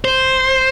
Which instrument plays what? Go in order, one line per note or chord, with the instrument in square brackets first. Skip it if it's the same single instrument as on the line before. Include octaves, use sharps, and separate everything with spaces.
[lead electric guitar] C5